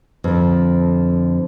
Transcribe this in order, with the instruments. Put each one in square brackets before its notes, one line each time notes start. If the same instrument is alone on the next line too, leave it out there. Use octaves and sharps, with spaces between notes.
[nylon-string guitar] F2 D3